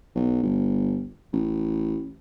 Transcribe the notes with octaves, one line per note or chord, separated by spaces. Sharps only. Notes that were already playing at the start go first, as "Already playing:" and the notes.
B1
G1
A1